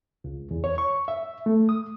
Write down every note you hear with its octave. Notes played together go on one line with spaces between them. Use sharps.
C#2
E2
C#5
C#6
E5
A3
D#6